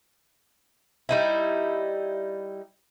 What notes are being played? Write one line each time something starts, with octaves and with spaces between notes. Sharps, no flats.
G3 D#4 E4